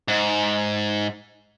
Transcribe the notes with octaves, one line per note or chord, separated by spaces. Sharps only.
G#2